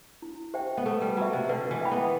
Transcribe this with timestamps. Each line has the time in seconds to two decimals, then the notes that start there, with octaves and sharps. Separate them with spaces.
0.22 E4
0.54 G4 C5 E5 G5
0.77 B3
0.86 A3 A4
1.01 G3
1.17 F#3 E5 B5
1.33 C3
1.49 D3 B4
1.71 E3
1.81 E5 G5 B5
1.91 B3